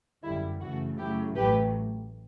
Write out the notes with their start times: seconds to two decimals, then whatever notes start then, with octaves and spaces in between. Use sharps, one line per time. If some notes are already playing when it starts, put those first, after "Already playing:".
0.24 G1 F#2 D3 G3 E4
0.61 F#2 C#3 E3 A3 F#4
0.98 F#2 C#3 F#3 A3 E4 G4
1.36 A1 A2 F#3 A3 G4 B4